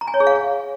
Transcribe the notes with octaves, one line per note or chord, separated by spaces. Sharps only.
A#5
G#5
C#5
G#4
F5